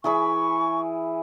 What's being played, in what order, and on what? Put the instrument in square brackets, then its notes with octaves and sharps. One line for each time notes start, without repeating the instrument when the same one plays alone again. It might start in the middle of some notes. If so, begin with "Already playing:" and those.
[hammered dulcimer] E3 G#4 B5 [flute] C#6